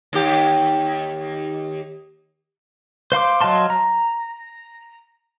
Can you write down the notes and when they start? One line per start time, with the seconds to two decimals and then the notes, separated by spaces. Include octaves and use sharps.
0.13 D#2 G4
3.12 C5 F5 C6 D6
3.41 F#3 D#5 F5 A5 C6
3.70 A#5